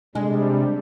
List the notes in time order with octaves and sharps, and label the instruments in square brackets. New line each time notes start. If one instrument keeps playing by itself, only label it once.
[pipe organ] C3 G3 [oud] G#3 [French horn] D4